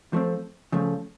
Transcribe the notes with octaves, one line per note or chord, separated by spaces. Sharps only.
F3 A3 C4
C#3 F3 A3